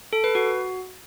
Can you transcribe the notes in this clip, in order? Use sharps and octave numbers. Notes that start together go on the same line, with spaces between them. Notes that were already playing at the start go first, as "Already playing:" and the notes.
A4
B4
F#4